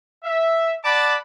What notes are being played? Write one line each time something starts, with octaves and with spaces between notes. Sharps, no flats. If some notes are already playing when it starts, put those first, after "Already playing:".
E5
D5 F#5 A5 B5 D6